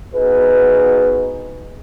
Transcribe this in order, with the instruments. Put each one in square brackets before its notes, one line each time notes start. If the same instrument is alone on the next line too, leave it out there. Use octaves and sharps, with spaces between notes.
[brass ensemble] B3 D#4 F#4 G#4 B4